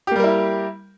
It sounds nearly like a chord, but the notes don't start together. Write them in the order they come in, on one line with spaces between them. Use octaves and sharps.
G4 A#3 G3 A#4 E4